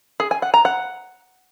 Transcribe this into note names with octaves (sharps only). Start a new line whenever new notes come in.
G#4
G#5
F#5
A#5
F#5